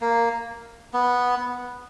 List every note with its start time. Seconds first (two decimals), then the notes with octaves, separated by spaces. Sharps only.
0.01 A#3
0.93 B3